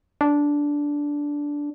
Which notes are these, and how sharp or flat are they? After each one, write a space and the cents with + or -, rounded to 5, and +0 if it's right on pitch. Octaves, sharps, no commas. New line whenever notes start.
D4 -10